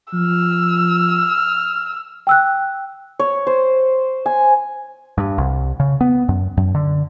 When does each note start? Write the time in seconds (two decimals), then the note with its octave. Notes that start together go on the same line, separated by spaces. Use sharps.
0.13 F3 E6 F6
2.27 G5 E6 F#6
3.19 C#5
3.47 C5
4.26 G#5
5.18 G2
5.38 C2
5.80 C#3
6.01 B3
6.29 F#2
6.57 F#2
6.75 D3